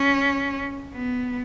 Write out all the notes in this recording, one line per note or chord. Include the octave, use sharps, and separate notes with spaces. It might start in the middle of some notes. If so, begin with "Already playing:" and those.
Already playing: C#4
B3